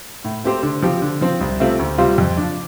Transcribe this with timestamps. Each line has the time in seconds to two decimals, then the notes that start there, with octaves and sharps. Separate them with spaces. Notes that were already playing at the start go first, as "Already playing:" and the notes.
0.24 A2
0.44 A3 C4 G4 C5
0.63 D3
0.83 F3 C4 G4
1.02 D3
1.21 F3 C4
1.41 C2
1.60 C3 A3 C4 F4
1.79 D2
1.98 C3 G3 F4 C5
2.18 F2
2.37 F3 D4